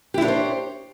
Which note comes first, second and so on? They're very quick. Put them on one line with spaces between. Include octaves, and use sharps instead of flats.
G4 E4 D4 C#5 C5